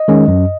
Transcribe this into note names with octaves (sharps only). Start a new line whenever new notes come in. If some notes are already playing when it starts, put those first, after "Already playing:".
Already playing: D#5
D#3 G#3 C#4
F#2